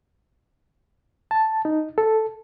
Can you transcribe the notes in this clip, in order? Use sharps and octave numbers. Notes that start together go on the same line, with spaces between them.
A5
D#4
A4